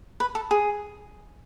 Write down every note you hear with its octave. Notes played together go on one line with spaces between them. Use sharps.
B4
A4
G#4